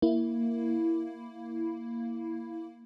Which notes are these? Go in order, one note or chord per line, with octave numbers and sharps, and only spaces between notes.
A#3 E4